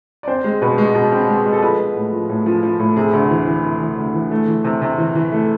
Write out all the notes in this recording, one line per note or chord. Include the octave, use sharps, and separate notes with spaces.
D5
C4 C5
G#3
B2 B4
G#3
B2
C4
G#3
G#3
A4
F3 B4
B3
A2
F3
A2
F3
F3
A2
C3 G#4
D2
E3
E3
C3
E3
D2
E3
A3
E3
C3
C3
E3
E3
A3